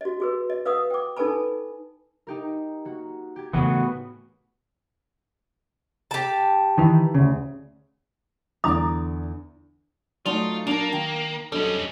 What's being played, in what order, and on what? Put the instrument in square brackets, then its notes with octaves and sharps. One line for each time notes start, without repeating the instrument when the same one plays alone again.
[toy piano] F#4 D#5
F#4 G#4 B4
D#5
B4 F5 F#5 D#6
G5 D6
D#4 A4 B4 G#5 A5 B5
[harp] D#4 G4 A#4
A#3 F#4
G4 G#6
[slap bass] A2 C#3 E3 [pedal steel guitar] B3 F#4
[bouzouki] G4 A5
[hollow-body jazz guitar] D#3 E3
D2 C#3
[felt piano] E2 D3 [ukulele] D5 A#5 [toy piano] D#6
[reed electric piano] F#3 [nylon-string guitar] A3 D#4 D5 [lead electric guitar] F4
[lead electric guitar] A#3 [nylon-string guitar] D4 A#4
[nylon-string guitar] D#3 G5
[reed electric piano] F#3 D4 A4 [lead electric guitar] G3 C#4 [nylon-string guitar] D#5